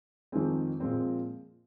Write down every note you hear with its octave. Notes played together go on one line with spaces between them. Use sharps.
F2 D#3 G#3 C4 G#4
A#2 F3 G#3 C4